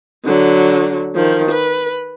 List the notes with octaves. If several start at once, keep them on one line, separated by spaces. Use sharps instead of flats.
D3 F#3
D#3 F3
B4